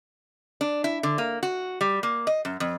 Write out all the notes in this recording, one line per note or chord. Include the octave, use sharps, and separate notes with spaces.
D4
E4
D3
A#3
F#4
G3
A#3
D#5
F#2
F2